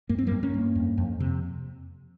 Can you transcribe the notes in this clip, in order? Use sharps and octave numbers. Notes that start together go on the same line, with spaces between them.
G2 A#3
C4
G2 G3 A#3
A#3 C#4
G2
F2
F2
C3